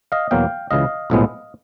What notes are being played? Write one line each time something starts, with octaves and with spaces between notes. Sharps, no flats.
D#5 F5
E2 B2 F#3 A#3 F5 G5
C#2 C#3 E3 D#5 F5
B1 A2 F3 G#3 B3